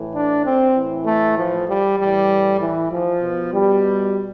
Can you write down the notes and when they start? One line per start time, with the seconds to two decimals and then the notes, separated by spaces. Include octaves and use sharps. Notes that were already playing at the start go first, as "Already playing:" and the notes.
Already playing: A2 E3
0.13 D4
0.45 C4
0.75 A2 E3
1.05 A3
1.37 F3
1.67 G3
1.98 A2 E3 G3
2.60 E3
2.91 F3
3.22 B2
3.53 G3